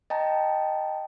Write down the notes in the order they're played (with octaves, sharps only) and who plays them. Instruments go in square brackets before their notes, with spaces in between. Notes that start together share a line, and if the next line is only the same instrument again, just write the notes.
[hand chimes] D#5 G5 A5 A#5